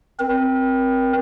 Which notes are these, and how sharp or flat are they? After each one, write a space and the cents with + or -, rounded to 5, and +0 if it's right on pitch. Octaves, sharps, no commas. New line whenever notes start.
C4 +0 A#4 +30